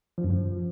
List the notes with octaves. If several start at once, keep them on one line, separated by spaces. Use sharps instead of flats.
F3
F#2
F3